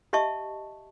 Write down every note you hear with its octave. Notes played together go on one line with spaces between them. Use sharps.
G4 D#5 E5 A5 C#6